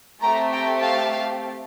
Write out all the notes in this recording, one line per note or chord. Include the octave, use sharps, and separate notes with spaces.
A3 C4 G4 G5 A#5
G5 A#5
F5 A5